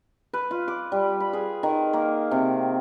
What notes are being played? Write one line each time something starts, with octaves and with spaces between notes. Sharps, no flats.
B4
F4
D6
G3
B5
G#4
D#3
A#3
C3